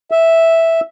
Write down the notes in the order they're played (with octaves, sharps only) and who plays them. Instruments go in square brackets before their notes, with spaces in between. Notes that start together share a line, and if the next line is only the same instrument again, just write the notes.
[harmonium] E5